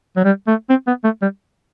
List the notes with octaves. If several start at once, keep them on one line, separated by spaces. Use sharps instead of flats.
F#3
G3
A3
C4
B3
A3
G3